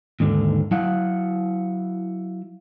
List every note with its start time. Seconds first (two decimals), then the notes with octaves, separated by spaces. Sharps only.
0.20 D#2 G#2 D3
0.71 F#3 E4 F5 F#5